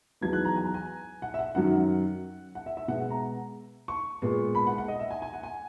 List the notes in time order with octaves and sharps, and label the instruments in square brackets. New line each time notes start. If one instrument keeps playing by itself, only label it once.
[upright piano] E2 D#3 F#3 B3 G#6
F#6
A#5
G#5
A#5
G#5
F#5
E5
F#5
F#2 D#3 F#3 F#5
F#5
E5
E5
B2 G#3 B3 F#5
F#5
A#5
C#6
A#2 G#3 B3
B5
F#5
F#5
D#5
E5
G#5
G#5
F#5
G#5